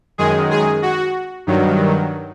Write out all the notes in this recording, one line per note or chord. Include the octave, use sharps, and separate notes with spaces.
F#2 D#3 G#3 G#4
G#4
F#4
G2 D#3 F#3